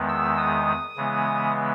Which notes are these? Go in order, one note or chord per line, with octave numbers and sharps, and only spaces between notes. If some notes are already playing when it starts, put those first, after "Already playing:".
Already playing: E2 D#3 G#3 B3
E6
D#6
C#3 E3 G#3 B3